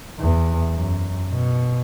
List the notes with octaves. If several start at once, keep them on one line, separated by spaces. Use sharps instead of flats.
E2
F#2
B2